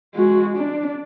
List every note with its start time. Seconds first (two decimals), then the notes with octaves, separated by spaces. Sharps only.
0.15 G#3 F#4
0.57 D4